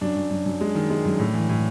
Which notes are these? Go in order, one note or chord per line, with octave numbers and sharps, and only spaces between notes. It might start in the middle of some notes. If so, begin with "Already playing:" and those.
F#2 D4
F#2
F#2
F#2
G#3
D#3
G#3
F#2
A2
E3
A2